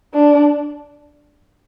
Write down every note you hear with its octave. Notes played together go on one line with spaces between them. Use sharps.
D4